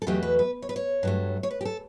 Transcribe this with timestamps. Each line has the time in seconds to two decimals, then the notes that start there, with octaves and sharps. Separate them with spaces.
0.02 A4
0.07 E2 B2 F#3 A3 G4
0.23 B4
0.39 B4
0.62 C#5
0.69 B4
0.76 C#5
1.03 G2 F#3 A3
1.43 C#5
1.51 B4
1.61 G4
1.65 A4